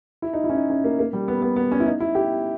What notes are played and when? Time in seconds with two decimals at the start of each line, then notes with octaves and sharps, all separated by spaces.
0.22 E4
0.33 D#4
0.44 E4
0.49 C#4
0.55 D#4
0.70 C#4
0.84 A#3
0.99 A#3
1.13 G3
1.28 B3
1.42 B3
1.56 B3
1.72 C#4
1.80 E4
1.86 D#4
2.00 E4
2.15 G4